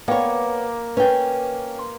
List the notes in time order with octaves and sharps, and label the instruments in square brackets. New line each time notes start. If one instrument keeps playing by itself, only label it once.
[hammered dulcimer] A#3 [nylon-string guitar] B3 C#5 [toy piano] D5 G5
[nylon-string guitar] C#4 G5 [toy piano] B4
[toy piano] C6